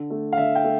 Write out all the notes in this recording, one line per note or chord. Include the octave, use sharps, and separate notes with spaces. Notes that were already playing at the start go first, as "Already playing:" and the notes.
Already playing: D3
A3
F5
D3 E5
G5
A3